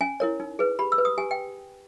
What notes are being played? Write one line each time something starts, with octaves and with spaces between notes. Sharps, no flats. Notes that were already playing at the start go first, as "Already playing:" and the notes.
C#4 G#5
E4 A#4 C#5
D#4
G#4 B4
G4 B5
E6
B4
D#6
G4 G#5
G5